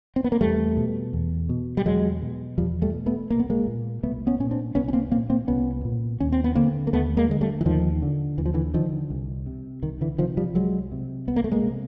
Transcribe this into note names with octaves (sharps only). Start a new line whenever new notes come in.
C4
B3
A#3
E2 G3 A3
B2
E2
B2
G3
E2 F#3 G#3
B2
E2 F3 G3
G3 A3
B2
A3 B3
C2 A#3
B3
G#3 A#3
A#2
C2 A3 B3
B3 C#4
A#2 C#4
C4 D4
C2 B3 C#4
C#4
A#3 C4
A#2 A#3 C4
A#3 C4
C2 B3 C#4
A#2
D#2 C#4
C4
B3
D3 A#3 C4
A#3
D#2 A3 B3
G#3 A#3
D3 G#3
G3 A3
E3
D#2 D#3 F3
D3
D#2 E3
F3
D3 E3
D3 D#3 F3
C2
C3
C2 D#3
D3 E3
C3 D#3 F3
F3 G3
C2 F#3 G#3
C3
C2 B3
A#3
A3
G#3 A#3
C3